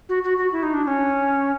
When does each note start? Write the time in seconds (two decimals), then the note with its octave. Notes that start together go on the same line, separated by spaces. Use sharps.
0.09 F#4
0.24 F#4
0.38 F#4
0.52 E4
0.63 D#4
0.74 D4
0.84 D4
0.87 C#4